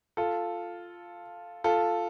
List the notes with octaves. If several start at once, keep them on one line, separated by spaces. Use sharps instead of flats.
F4 A4
F4 A4